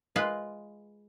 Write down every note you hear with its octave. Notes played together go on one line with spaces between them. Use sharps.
G#3 F4 B4